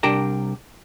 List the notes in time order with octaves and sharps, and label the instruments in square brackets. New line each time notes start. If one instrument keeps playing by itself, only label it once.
[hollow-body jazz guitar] C2 D4 G4 A#4 A5 A#5